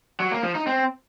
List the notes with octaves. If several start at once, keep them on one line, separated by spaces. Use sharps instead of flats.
F#3
A#3
F3
D#4
C4